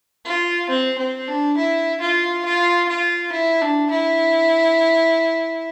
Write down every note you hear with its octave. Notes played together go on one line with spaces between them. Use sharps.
F4
C4
C4
D4
E4
F4
F4
F4
E4
D4
E4